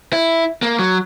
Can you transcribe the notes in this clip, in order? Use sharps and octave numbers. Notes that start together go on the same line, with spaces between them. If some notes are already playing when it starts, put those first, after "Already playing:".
E4
A#3
F#3